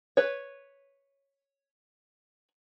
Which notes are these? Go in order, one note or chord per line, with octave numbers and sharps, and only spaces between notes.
B4 C#5